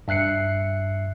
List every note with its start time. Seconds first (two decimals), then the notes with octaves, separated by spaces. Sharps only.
0.08 G2 E5 F#6 C7 C#7